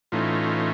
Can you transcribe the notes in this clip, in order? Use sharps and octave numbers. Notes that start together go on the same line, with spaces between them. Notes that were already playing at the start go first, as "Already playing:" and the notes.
A2 E3 A3 C#4 D#4 F4